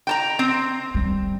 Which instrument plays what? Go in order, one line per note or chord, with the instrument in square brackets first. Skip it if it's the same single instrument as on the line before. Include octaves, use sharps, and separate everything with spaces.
[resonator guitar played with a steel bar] G5 A5 A#5
C4
[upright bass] G3